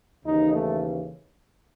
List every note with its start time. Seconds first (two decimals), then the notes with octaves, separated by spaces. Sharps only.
0.25 D#2 C#3 E3 D#4
0.53 A3